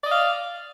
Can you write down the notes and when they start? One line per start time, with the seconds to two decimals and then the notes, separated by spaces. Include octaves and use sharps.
0.02 D5
0.06 D#5
0.10 F5